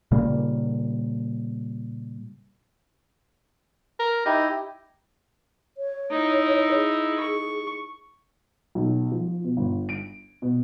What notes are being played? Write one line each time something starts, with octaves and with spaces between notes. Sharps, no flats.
A#2 C#3 G3 A#3
A#4
D#4 E4 G4
C#5
D#4 E4
G#4
C#6
B1
F3
B2
G1
D7
B2